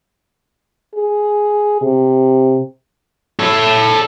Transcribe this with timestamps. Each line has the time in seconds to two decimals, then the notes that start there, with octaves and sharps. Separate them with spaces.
0.95 G#4
1.81 C3
3.39 A4 C#5